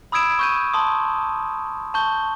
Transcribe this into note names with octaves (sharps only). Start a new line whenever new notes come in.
B5 D#6 E6 G#6 D7 E7
C#6 G6 D#7
A5 C6 D#6
A5 C#6 G6 G7